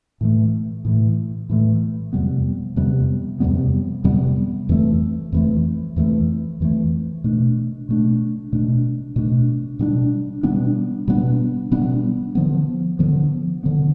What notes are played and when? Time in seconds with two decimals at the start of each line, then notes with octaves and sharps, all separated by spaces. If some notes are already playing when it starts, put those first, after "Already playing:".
0.21 A2 E3 A3
0.85 A2 E3 A3
1.49 A2 E3 A3
2.13 F2 C3 G3 B3
2.76 F2 C3 G3 B3
3.40 F2 C3 G3 B3
4.04 F2 C3 G3 B3
4.69 F2 E3 A3
5.32 F2 E3 A3
5.96 F2 E3 A3
6.60 F2 E3 A3
7.24 B2 A3 D4
7.89 B2 A3 D4
8.53 B2 A3 D4
9.16 B2 A3 D4
9.79 B2 G3 B3 D4
10.43 B2 G3 B3 D4
11.08 B2 G3 B3 D4
11.71 B2 G3 B3 D4
12.35 D3 F3 B3
12.99 D3 F3 B3
13.63 D3 F3 B3